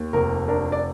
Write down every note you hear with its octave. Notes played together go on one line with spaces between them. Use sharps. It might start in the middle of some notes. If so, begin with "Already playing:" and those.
Already playing: D#2
F1 A#4
D4 A#4
D5